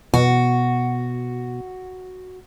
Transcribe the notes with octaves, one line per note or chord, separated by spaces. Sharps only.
B2 F#4